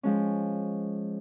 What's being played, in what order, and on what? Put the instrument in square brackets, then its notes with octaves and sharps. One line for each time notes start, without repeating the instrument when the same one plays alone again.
[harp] F3 G#3 C#4